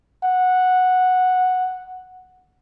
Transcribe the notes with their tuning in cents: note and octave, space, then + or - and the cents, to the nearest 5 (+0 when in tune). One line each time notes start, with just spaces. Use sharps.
F#5 -5